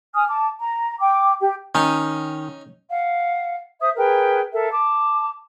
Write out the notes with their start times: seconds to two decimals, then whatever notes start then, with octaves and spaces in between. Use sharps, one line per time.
0.15 G#5 D#6 F6
0.28 A5 D6
0.59 A#5
1.00 G5 D6
1.41 G4 G5
1.75 D#3 C#4 D#4
2.90 F5 F#5
3.81 C5 E5 D#6
3.97 G#4 A#4 B4 G5
4.53 A4 A#4 E5
4.71 A5 D6